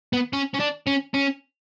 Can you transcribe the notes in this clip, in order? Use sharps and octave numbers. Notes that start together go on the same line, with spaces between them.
B3
C#4
C#4
D4
C#4
C#4